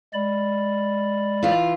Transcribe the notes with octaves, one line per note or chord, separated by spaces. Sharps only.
G#3 D5 B5
E3 F4